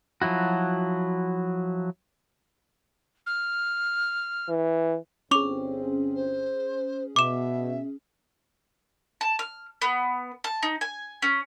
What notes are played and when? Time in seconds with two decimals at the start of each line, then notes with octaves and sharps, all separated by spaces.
0.22 F3 F#3 E4 F#4
3.26 F6
4.49 E3
5.31 G1 C4 C#4 G#4 C#6 D6 F7
6.15 C5
7.16 B2 E5 D6 E7
9.21 A5
9.39 F6
9.82 B3
10.44 A5
10.63 D#4
10.81 G#5
11.22 C#4